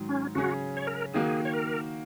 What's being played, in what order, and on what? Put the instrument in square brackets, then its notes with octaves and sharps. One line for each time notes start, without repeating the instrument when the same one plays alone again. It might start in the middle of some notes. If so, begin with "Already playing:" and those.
Already playing: [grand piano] G#2 D#3 F#3
[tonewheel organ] C#4
[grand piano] C#3 F#3 C#4 G#4 [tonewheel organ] F#4
[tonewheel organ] C#5
A#4
[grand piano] D#3 A#3 F#4 [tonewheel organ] G#4
[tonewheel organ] C#5
A#4